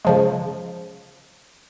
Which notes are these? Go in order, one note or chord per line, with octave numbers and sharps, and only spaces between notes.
C#3 F3 G#3